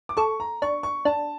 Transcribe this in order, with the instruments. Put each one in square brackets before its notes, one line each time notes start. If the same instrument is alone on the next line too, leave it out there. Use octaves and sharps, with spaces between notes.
[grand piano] D6
[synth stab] A4 [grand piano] C#6
[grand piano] A#5
[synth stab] D4 [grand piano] C#6
[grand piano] C#6
[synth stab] D4 [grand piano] A5